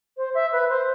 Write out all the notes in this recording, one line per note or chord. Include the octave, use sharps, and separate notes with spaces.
C5
E5
B4
C5